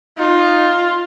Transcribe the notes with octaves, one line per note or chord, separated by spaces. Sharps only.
D#4 F4